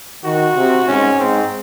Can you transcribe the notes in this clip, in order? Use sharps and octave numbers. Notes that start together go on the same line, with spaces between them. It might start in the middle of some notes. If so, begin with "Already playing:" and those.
D#3 F#4
C3
G#2 C#4
G#2 C4